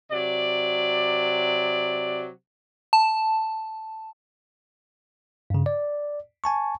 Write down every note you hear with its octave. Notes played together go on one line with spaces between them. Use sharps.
C3 F#3 D5
A5
G2 C#3
D5
G#5 A5 C#6